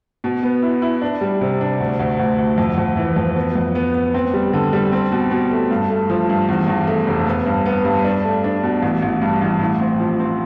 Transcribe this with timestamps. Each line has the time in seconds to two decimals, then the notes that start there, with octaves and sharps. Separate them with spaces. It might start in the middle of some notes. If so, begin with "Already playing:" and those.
0.24 B2
0.43 B3
0.62 E4
0.82 E4
1.02 D4
1.21 G3
1.41 C3
1.61 D4
1.80 D2
1.99 D2
2.19 D2
2.38 D2
2.58 F2
2.78 F2
2.97 E3
3.16 F2
3.36 B3
3.56 F2
3.75 B3
3.95 B3
4.14 C4
4.34 G3
4.53 D3
4.73 G3
4.92 C4
5.12 B2
5.31 B2
5.51 A3
5.71 G2
5.90 A3
6.10 F3
6.30 G2
6.49 E2
6.68 E2
6.87 A3
7.07 F1
7.27 B3
7.46 G2
7.66 B3
7.85 G2
8.05 D4
8.24 A3
8.44 D4
8.63 B2
8.82 A1
9.03 A1
9.22 G2
9.42 A1
9.61 A2
9.80 C4
10.00 F3
10.19 C4